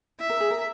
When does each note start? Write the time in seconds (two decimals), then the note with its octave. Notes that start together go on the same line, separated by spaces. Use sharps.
0.20 E4 E5
0.30 A#4
0.40 G#4
0.51 A#4